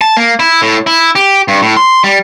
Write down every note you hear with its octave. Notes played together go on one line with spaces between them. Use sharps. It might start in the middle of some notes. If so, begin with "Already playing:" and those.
A5
A#3
E4
A2
E4
G4
G2
A2
C6
G3